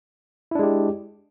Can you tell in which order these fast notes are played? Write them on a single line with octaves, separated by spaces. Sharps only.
E4 D4 G#3 G4